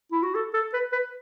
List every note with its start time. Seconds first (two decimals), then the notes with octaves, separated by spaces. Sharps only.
0.12 E4
0.23 F#4
0.35 A4
0.54 A4
0.73 B4
0.93 B4